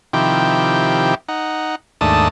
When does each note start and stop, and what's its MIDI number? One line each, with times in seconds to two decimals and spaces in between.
0.13 1.15 48
0.13 1.15 51
0.13 1.15 53
0.13 1.15 64
0.13 1.15 67
0.13 1.15 79
1.28 1.75 63
1.28 1.75 78
2.01 2.28 39
2.01 2.28 44
2.01 2.28 57
2.01 2.28 62
2.01 2.28 81
2.01 2.28 87